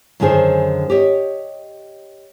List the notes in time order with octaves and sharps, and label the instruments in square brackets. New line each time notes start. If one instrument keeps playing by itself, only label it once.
[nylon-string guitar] F#2 D3 D#3 G#4 C5
G4 C#5 D#5